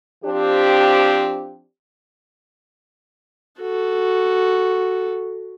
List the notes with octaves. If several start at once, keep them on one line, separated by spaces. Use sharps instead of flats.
F3 C4 D4 G4
F#4 A4